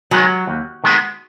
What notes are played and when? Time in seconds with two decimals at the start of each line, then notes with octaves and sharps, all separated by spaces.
0.11 D#3 F#3 G#3 B3
0.47 D#2
0.84 D#3 G#3 B3